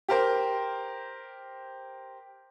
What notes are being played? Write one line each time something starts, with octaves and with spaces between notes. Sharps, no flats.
G4 A#4 C5